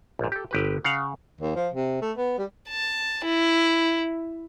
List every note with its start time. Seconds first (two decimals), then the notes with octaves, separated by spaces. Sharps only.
0.19 A#1 G#2
0.32 G4 A4
0.51 G1 G4 B4
0.84 C#3 F5 F#5
1.41 D#2
1.56 F3
1.74 C3
2.02 A3
2.17 B3
2.38 G3
2.69 A5
3.24 E4